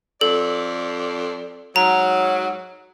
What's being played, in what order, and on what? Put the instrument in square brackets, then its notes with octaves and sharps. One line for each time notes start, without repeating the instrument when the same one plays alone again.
[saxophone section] F2 D5 [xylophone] A4
[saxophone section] G#2 F#3 [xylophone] A#5